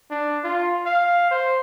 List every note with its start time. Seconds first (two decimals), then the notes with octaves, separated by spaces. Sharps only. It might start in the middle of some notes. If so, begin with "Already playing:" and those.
0.11 D4
0.44 F4
0.86 F5
1.31 C5